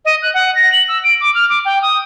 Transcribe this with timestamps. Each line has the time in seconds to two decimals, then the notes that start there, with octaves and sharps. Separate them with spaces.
0.05 D#5
0.22 F#6
0.34 F#5
0.55 A#6
0.72 F#7
0.88 E6
1.04 D7
1.21 D6
1.35 F6
1.50 D6
1.65 G5
1.82 D#6